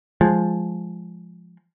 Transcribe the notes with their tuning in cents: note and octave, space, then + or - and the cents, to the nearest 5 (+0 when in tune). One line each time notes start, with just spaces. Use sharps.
F3 +0 G#3 +0